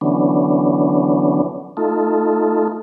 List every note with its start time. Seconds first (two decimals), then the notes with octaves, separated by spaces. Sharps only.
0.01 D3 E3 F#3 B3 C#4 D4
1.77 A3 D#4 F4 A4